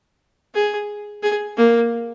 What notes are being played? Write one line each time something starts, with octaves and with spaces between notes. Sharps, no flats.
G#4
G#4
A#3